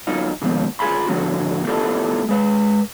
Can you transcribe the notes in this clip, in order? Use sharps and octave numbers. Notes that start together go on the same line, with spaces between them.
F#3 D#4 F4
D#2 G#2 B2 F3
F4 G#4 G#5 B5 C6
A2 D3 F3 D4 F#4
A3 B3 E4 F4 G4 A4
G#3 B4